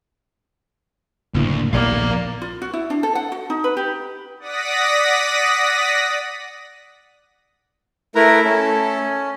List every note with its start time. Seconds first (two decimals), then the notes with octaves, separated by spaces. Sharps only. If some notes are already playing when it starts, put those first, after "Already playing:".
1.34 F#1 D2 A2 A#3
1.73 A#1 D#2 A2 E3 A#3 B3 D5 F5
2.42 F4
2.62 F#4
2.73 E4
2.90 D4
3.03 A4
3.15 F#5
3.32 F#4
3.50 D#4
3.64 B4
3.77 G4
4.39 D5 F#5 D#6 A#6 B6
8.15 A3 E4 A#4 B4 E5 A#5
8.45 A3 C#4 A4